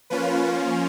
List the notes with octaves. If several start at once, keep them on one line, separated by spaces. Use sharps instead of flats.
F3 A#3 C#4 F4 B4